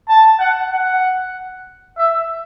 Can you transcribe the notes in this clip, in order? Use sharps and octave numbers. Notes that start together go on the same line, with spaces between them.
A5
F#5
F#5
E5